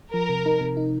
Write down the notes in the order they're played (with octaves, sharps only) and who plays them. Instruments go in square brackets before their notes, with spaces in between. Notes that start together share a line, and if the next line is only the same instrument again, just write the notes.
[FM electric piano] F3 [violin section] A#4
[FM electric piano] C3
D#4
C3
D#4